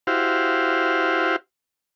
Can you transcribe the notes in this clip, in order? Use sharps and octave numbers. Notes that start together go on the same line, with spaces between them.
E4 F#4 G4 C5 F5